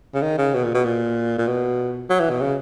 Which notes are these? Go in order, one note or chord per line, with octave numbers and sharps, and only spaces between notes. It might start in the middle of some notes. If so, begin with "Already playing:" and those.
C#3
D#3
C#3
B2
A#2
B2
A#2
A#2
B2
F#3
E3
B2
C#3